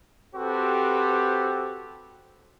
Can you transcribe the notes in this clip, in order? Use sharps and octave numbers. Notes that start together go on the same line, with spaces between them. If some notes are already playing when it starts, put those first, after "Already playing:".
C4 F#4 G4 A4 B4 C5